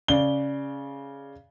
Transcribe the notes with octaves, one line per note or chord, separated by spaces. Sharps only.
C#3 D5 G7